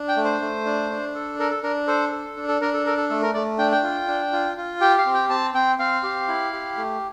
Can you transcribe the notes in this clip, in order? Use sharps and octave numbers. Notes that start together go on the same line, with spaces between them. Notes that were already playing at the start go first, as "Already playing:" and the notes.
Already playing: D4
G5
A3
C5
A3
D4
D4
A4
A4 A#4
A4
D4 A#4
A4 C5
A4
D4
A4
D4 A#4
A4
A4 A#4
A4
A3 A4
A#4
A3 D5
D4 G5
G5
F4
D4
F4
F4
G4 G5
F5
C4
G5
C4 A5
C4 G5
C4 F5
G4
E4
G4
A3